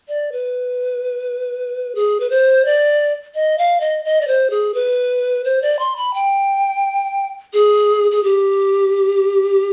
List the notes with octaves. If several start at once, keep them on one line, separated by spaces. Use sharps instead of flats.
D5
B4
G#4
B4
C5
D5
D#5
F5
D#5
D#5
D5
C5
G#4
B4
C5
D5
C6
B5
G5
G#4
G#4
G4